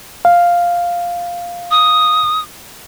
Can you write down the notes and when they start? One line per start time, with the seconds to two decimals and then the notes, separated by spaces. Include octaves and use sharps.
0.25 F5
1.71 D#6